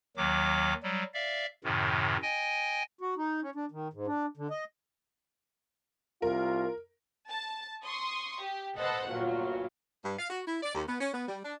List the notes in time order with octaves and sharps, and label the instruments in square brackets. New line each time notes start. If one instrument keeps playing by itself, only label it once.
[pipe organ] D#2 D#3 F#3 D6
F#3 G3
D5 E5 F5
F#2 A2 C3 D#3
D#5 G5 G#5
[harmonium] F#4
D#4
C#4
D4
D#3
G#2
D4
D3
D#5
[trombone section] C2 F4 [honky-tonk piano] A#4
[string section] A5
C6 C#6 D#6
G4
A4 B4 C5 D#5 F#5
G1 A#2 F#3 F4
[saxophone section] G2
F5
F#4
E4
D5
D#2
B3
C#4
B3
G3
D4